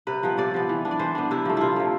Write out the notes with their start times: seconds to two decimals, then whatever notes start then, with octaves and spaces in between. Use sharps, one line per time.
0.07 C3 B4
0.23 F3 B3
0.38 C3 D5
0.54 F3 B3
0.69 E3
0.85 B3 D4
0.91 D5
0.99 E3 C5
1.15 B3 D4
1.31 C3 E4
1.45 F3 A3
1.57 C3 E4 F4
1.76 F3 A3